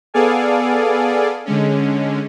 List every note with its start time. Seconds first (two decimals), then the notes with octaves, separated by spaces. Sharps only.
0.14 B3 G#4 A4 D5 F5 G#5
1.46 D3 G#3 C#4